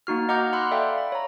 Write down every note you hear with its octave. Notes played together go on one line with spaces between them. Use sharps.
A#3 D#4 F#4 F6
D#5 F#5 A#5 D6 F6 G6
F#5 B5 C6 E6 F#6
A4 D5 E5 F5 G5
B5
C#5 A#5